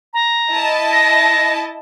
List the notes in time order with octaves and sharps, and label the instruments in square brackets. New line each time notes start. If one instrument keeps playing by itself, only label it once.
[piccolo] A#5
[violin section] E4 D#5 A5
[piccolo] A#6